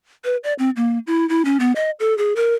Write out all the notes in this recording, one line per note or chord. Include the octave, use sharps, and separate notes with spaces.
B4
D5
C4
A#3
E4
E4
C#4
B3
D#5
A4
G#4
A#4